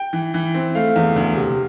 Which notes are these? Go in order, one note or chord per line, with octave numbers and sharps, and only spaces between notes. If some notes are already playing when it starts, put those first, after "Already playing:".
Already playing: G5
E3
E3
C4
A3 F5
E2
D2
C3